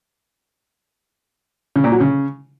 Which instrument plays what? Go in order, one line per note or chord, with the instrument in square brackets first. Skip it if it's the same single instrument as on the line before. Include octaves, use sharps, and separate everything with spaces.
[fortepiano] C#3
A#2
F#3
C#3